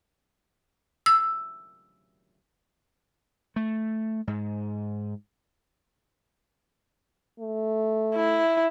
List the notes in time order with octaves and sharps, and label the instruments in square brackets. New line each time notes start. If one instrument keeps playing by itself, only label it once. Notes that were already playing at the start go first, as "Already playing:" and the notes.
[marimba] E6
[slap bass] A3
G#2
[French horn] A3
[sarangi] E4